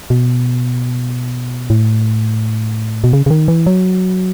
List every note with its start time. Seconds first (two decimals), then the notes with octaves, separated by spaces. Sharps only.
0.10 B2
1.70 A2
3.04 B2
3.13 C#3
3.26 C#3
3.30 D#3
3.48 E3
3.66 F#3